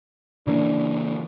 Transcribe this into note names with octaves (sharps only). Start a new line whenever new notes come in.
C#3 E3 A#3 D4